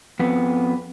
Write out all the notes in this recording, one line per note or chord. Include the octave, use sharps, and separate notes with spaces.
F2 B3